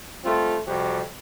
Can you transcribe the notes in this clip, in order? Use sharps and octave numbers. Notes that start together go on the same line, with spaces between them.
G3 A3 C4 F4
F2 C3 G3 F#4 G4